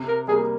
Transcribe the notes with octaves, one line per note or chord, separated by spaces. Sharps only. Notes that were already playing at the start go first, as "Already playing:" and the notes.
Already playing: C3
A#4
G3 A#3 G#4